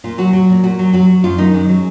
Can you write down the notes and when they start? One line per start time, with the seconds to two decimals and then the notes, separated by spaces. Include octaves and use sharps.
0.04 A#2 F4
0.18 F#3 F#4
0.33 F#3
0.49 A#2
0.64 A#2 F#4
0.79 F#3
0.93 F#3 F#4
1.09 F#3
1.24 F#2 F4
1.38 D#3 D#4
1.54 F#2 G#3
1.69 F#3